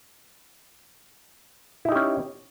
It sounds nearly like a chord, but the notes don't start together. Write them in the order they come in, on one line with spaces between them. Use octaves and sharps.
E4 D#4 G4 C#4